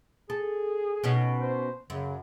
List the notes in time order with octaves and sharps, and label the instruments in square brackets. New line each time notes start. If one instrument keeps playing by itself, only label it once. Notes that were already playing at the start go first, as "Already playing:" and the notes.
[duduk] G#4 [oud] A4
[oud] B2 C#4 D#4
[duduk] C5
[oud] F#2 [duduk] C#3